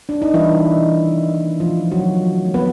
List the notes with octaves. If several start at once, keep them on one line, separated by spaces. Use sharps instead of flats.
D4
D#4
E3 G3 E4
A#3
C3
D#3
G3
A#3
F3 A3 F4
C4
F#3 F#4
D3
F3
A3
B3 B4